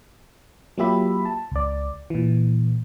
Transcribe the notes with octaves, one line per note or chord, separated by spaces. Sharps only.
F#3 A#3 F4 G4 E5 B5
A5
C#2 D5
A#2 E3